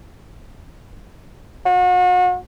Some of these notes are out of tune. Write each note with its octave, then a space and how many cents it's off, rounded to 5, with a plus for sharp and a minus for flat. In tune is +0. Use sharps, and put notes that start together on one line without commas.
F#4 -40